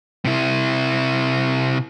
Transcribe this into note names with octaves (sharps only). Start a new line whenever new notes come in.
C3 E4